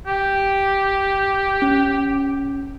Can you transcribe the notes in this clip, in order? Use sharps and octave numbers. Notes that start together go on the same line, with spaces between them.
G4
C#4